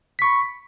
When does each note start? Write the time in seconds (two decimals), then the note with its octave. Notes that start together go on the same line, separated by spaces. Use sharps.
0.19 B6
0.22 C#6
0.25 B5